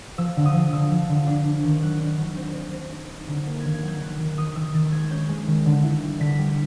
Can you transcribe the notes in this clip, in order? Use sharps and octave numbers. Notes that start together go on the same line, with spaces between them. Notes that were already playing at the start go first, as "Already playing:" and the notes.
F3 E6
D3
D#6
F3
D3 E6
F3
D3
D4
D4
D#3
F#3 F#6
D4
F#3
C4 G6
C4
C4
D#4
D#4
D3
A#3
D#3 G#6
G#6
F#3 G6
D#3 F#6
D#3
D#3 D#6
D#3 E6
D#3 A6
G#3 G#6
C#4 G6
G#3
D#3
D3
E4
G3
D3 B6
G3